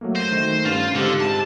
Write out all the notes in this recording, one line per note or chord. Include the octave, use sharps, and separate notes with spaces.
F#3 A3 A#3
C5 A#6 D#7
D#3 A3
G2 C#4 F4 C6
G#2 D3 C4 G4
A5